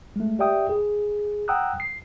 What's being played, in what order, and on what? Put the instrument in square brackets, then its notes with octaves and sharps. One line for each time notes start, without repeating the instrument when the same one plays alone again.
[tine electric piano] G#3 A3
G4 D5 E5 G5 D#6
G#4
F#5 G5 A#5 D#6 E6 F#6
C7